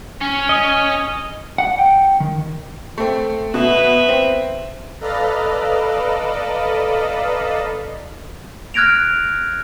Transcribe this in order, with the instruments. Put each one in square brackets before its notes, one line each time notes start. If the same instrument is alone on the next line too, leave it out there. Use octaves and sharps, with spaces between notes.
[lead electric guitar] C#4
[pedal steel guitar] D#5
[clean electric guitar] F#5
G5
D#3
[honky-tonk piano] A3 C4
[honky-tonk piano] B2 [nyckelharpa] B4 E5
[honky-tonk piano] C4
[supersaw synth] A4 B4 D5 D#5 F5 A#5
[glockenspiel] F6 F#6 G#6 A#6 D7 F7